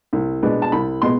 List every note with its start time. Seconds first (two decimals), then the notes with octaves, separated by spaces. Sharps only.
0.13 C2
0.43 B2 G#3 B3 D4
0.62 A5
0.72 C2 B5
1.02 B2 G#3 B3 C6